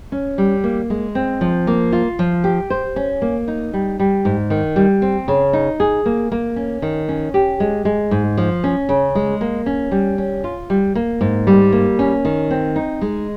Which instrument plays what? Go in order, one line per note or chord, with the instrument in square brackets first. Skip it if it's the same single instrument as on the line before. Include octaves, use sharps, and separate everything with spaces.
[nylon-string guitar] C#4
G3
A#3
G#3
C4
F3
A#3
F4
F3
G4
C5
C#4
A#3
D#4
G3
G3
G#2
D#3
G3
C4
C#3
D#4
G#4
A#3
A#3
C#4
D#3
C#4
G4
G#3
G#3
G#2
F3
C#4
C#3
G#3
A#3
C#4
G3
C#4
F4
G3
A#3
G#2
G3
A#3
C#4
D#3
C4
D#4
G#3